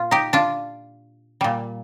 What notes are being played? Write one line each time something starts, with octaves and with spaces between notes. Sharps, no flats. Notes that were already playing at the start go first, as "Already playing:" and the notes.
Already playing: A#2 F4
D#4 G4
D4 F4
A#2 G3